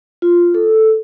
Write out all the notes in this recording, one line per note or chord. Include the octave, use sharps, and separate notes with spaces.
F4
A4